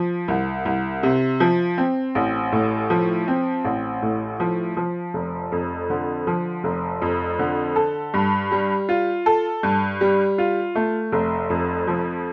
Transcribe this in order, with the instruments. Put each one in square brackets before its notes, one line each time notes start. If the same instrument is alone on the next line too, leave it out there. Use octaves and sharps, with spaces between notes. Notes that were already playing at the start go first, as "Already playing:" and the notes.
Already playing: [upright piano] F3
C2
C2
C3
F3
C4
A1
A2
F3
C4
A1
A2
F3
F3
F1
F2
D3
F3
F1
F2
D3
A4
G2
G3
F4
A4
G2
G3
F4
A3
F1
F2
F3